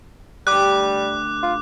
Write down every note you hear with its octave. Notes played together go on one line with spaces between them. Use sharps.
D2 G3 G4 D6 F#6
F4